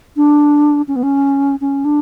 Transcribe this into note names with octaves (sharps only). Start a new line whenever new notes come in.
D4
C#4
B3
C#4
C#4
D4